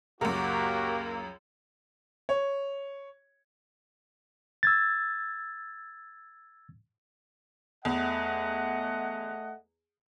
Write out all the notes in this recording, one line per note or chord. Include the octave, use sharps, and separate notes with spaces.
C#2 F#2 A#3 F#4 G4 A#4
C#5
E6 G#6 A6
E2 A3 D#5 F#5